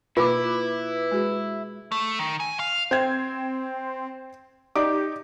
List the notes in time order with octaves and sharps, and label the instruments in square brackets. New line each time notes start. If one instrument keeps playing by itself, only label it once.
[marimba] B2 A#3 C#6 [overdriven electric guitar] E4 [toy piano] F4 [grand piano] B4 D6
[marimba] G#3 F#4 G#4
[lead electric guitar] A3
D#3
G#5
F5
[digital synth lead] C4 [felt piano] C5 G5 G#6
[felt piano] D#4 D5 D6 [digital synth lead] G4